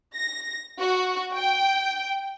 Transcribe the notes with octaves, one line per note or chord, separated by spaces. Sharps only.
A#6
F#4
G5